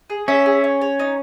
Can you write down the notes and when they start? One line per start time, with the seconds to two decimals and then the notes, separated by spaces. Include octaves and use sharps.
0.10 G#4
0.28 C#4 E5
0.46 G#4
0.64 C#5
0.81 C#5
0.99 D#4